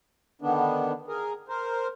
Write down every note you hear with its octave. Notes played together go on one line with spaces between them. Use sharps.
D3 D#3 B3 D4
G#4 A#4
A#4 C5